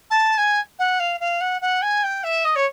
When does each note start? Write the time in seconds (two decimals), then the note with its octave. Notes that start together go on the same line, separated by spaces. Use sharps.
0.11 A5
0.38 G#5
0.79 F#5
1.00 F5
1.20 F5
1.41 F#5
1.61 F#5
1.82 G#5
2.04 G5
2.24 E5
2.45 D#5
2.56 C#5